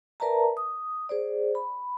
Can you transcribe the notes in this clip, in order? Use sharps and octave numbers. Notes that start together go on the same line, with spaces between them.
A#4 B4 D5 E5 A5 A#5
D#6
G#4 C5 D5
B5